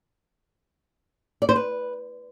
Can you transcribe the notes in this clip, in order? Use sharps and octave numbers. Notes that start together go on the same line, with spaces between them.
D5
C5
B4